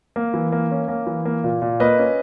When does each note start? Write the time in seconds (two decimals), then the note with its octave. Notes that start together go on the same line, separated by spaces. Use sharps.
0.16 A#3
0.34 E3
0.52 A#3
0.71 C#4
0.88 A#3
1.07 E3
1.26 A#3
1.44 A#2
1.62 A#2
1.80 A#3 B4 D#5
1.99 C#4